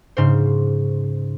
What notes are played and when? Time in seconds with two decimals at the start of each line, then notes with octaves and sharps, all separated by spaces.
0.17 G#2 C#3 C5